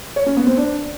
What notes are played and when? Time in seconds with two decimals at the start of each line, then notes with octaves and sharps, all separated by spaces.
0.16 C#5
0.26 C#4
0.37 B3
0.47 C4
0.57 D4